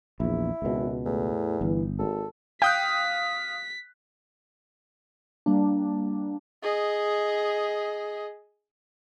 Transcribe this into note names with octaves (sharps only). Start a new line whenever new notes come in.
A#1 E2 E4
G#1 C#2 B2
E2 A2
G1 E3
G#1 A4
F5 G5 D#6 F#6 B6
G3 A#3 D4
G#4 D#5